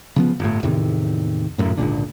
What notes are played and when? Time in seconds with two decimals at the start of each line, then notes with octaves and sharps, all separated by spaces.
0.16 C#3 F3 B3
0.40 G1 A2
0.63 E2 A2 C3 D#3
1.58 D#1 F#2 A2
1.77 G#1 C#2 A#2 D3